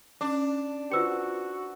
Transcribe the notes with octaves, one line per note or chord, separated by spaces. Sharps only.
C#4 D4 D6
F4 F#4 B4 C5 C6 E6 C#7